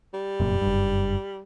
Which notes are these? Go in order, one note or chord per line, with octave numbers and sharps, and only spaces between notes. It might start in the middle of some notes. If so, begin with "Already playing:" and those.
G3
F1 F#2 A#2
F#1 G2